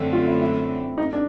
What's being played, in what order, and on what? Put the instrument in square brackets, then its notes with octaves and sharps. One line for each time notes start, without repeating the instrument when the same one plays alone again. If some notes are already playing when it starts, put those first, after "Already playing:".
Already playing: [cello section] F#2 D3 F#3 A3 C4
[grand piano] F4
E4
E4
D#4
D4